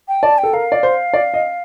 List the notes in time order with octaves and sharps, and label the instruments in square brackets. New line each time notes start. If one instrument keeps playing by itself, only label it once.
[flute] G5
[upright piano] D5 [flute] A5
[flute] G5
[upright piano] A4
[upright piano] A#4 [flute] F5
[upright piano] D5
C5
D5
D#5